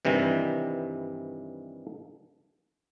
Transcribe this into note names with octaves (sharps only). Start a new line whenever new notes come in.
G2 C3 D#3 E3 G3